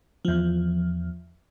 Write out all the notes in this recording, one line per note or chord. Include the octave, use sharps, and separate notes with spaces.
E2 F3